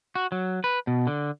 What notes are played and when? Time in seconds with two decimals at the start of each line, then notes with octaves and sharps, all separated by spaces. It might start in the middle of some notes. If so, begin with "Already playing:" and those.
0.15 F#4
0.32 F#3
0.64 B4
0.87 B2
1.07 D3